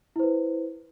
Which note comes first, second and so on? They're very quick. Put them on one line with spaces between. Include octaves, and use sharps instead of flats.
E4 C5 B4